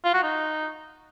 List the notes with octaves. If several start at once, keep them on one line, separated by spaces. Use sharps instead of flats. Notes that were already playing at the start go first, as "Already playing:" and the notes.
F4
F#4
D#4